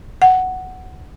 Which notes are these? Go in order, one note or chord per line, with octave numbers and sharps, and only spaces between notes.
F#5